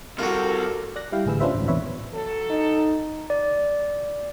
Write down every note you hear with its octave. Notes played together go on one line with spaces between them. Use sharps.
C3 G3 F4 F#4 A4 A#4
D5 F#6 A#6
G3 E4 F5 G5
A1 D2 G#4 B4 E6
C#4 D4 F4 B4 C5 E5
A1 D2 G#2
A1 E2 C3 B4 C#5 E5
F#3 A4
D#4
D5